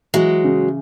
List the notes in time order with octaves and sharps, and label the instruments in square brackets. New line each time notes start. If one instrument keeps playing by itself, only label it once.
[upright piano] E3 [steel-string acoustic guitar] F#3 G#3
[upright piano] C#3